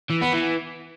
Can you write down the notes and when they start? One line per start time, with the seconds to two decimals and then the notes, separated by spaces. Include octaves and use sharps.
0.10 E3
0.22 B3
0.33 E3